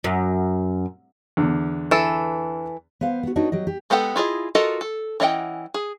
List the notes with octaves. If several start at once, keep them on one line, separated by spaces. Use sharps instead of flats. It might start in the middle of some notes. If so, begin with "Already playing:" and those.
F#2
E2 D3
E3 A4
B3 C5 F5
B3 F#4
D4 D#4 F#4 B4 C#5
F#3 G4 D#5
G4
G#3 B3 G4 A4 F#5
E4 F4 G#4 D#5
F4 F#4 A4 A#4 D#5
A4
E3 C#4 D#5 F#5 G5
G#4